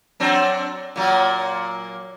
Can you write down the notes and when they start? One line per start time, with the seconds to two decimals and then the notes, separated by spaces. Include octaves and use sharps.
0.20 F#3 C4 D4
0.96 A#2 F#3 A#3